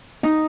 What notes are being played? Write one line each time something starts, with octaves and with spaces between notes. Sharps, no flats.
D#4